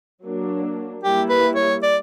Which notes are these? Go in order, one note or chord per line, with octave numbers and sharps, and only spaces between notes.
F#3 A#3 D4
G3 A#3 E4 G4
B4
C#5
D5